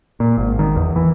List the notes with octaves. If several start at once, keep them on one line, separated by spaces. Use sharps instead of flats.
A#2
G#1
D#3
E2
E3